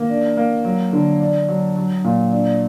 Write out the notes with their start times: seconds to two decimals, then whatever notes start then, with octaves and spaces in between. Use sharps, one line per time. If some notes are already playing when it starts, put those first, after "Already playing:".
Already playing: D#3 A#3
0.09 D4
0.37 A#3
0.65 F#3
0.93 D3
1.20 D4
1.49 F#3
1.76 F#3
2.04 A#2
2.32 D4